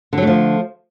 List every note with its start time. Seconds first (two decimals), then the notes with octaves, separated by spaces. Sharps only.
0.13 D3
0.18 F#3
0.22 A3
0.27 F3